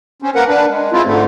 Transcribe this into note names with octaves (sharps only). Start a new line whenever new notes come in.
C4 C#4
A#3 A#4 B4 F#5
D4 B4
G#3
G#3 C4 E4 F4
G#2 D3 A3